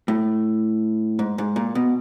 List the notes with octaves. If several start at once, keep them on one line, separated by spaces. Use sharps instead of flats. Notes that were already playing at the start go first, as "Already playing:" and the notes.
A2
G#2
G#2
A#2
B2